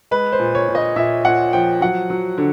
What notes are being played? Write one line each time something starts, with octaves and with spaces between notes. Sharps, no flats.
G#3 B4
C5
A#2
C#5
A#2
D#5
A#2 E5
A#2 F#5
F3 G5
F#3 F#5
F#3
D3